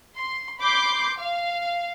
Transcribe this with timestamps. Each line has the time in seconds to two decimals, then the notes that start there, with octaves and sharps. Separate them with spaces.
0.15 C6
0.61 B5 C6 D6 G6 C7
1.17 F5